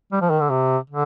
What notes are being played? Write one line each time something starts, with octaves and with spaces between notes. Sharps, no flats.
G3
F3
D#3
D3
C3
D3